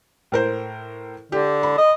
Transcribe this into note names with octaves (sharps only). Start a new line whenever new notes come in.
A2 A#4 C5
D3 G4
B5
D#5